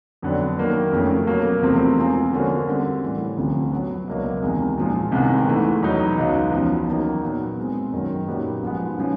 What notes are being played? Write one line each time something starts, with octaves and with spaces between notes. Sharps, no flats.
F2 D3 F#3 B3 D4
D#3 F#3 A#3
F2 C#3 F3 A3
B2 F#3 A#3
E2 C3 F3 A3 C4
B2 G#3 C4 F4 G#4
D3 F3 A#3 C#4 F#4
D3 G3 C4
A2 E3 G3
D2 C3 F3
B2 F#3 B3
C#2 B2 F#3 A#3 D4
E2 C3 D#3 G#3
A#2 F3 G#3
C2 C3 D#3 G#3 B3
G#2 E3 A3
E2 B2 F#3 B3 D#4
C#2 C#3 F#3 B3 D#4
E2 C#3 F3
D#3 F#3 A#3 D#4
A#2 F#3 B3
B2 G#3 C4
F#2 D#3 F#3
A#2 F#3 B3 D#4 G4
G#2 F3 G#3 B3
C#3 F3 G#3